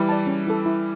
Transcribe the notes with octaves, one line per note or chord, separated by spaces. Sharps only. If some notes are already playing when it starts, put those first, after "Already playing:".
Already playing: E3 G3
D5 A5
C#4
E4 A4
E4